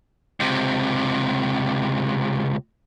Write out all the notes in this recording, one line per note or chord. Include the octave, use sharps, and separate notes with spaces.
C#2 C3